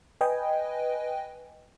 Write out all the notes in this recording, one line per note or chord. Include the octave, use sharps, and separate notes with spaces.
B4 D#5 G5 G#5